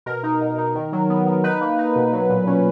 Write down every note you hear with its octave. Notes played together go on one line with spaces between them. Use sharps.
B2 A#4
D#4
B2
D#4
D#3
F#3
B3
B3
D#4 B4
A#3
D#4
B2
F#3
A#2
C#4